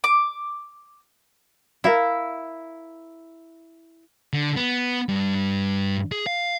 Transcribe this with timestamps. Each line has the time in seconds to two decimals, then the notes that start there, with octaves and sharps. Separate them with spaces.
0.04 D6
1.84 E4 A#4 E5 F5
4.33 D3
4.56 B3
5.09 G2
6.12 G#4
6.26 F5